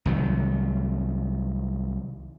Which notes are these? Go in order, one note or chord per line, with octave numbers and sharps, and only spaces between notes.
C2 D#3 F#3